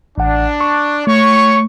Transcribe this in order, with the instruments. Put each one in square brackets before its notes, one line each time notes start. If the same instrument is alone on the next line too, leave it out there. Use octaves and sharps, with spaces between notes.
[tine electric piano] A1 F#5 [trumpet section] D4
[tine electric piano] C#6
[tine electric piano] A3 [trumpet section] C#5 C#6